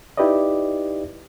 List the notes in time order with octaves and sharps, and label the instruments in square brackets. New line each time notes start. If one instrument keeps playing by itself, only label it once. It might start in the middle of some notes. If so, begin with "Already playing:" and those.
[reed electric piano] D#4 E4 G4 B4 D5 D#5